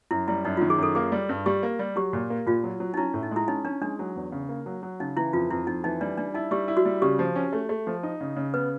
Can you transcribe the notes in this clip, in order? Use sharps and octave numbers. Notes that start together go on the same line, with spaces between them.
F#2 E4
G3 E4
F#2 D#4
F4
D#3
G#4
F#2 A4
A#3 G#4
G3
G2
G3 G4
A#3
G3
F#3 G4
A#2
A#3
A#2 F4
F#3
F#3
D#4
C#4 E4
A2
D#4
G#3 E4
C#4 D#4
C#4 D4
G#3 D4
F#3
E2
C#3
A#3
F#3
F#3
C#3 D#4
E3 E4
F2 F4
F2 E4
F2 D#4
E3 D#4
G3 D4
G3 D4
D#4 E4
G3 G4
E4
F#4
G3
C#3 G4
F3
C#4
A3
A3
F3
D#4
C#3
C#3
B3 B4